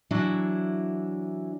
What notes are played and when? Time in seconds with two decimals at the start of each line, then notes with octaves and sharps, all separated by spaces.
0.11 E3 F#3 D4 E4